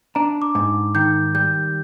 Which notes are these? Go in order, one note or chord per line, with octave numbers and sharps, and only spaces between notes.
D4 A#5
D6
G#2
D#3 G6
G3 G6